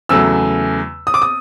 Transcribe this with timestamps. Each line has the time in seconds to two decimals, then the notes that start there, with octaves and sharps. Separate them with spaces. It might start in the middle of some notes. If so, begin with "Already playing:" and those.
0.09 E2 C#3 F#3 A3 E6
1.07 D#6
1.14 D6
1.22 D#6